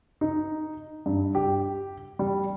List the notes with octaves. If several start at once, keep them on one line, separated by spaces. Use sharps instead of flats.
D#4
G2
G4
G3